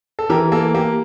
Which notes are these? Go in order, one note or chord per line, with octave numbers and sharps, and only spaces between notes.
A4
E3 G4 A#4
A#3 A4
A#3 G4